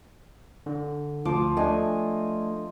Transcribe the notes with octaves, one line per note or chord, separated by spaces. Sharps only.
D3
D2 F3 D6
A3 D4 D#5 G#5